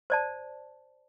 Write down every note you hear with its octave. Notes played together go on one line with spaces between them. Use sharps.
C5 D5 A5